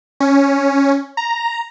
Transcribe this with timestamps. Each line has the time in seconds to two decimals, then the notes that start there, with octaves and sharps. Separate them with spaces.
0.20 C#4
1.17 A#5